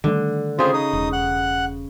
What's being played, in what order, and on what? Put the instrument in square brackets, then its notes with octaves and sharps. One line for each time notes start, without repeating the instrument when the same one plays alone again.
[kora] D3 [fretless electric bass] D#3 G3 A3
[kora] C#3 G#4 [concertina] C4 F4 C5
[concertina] D#4 D#6
[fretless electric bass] E1
[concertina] F#5 F#6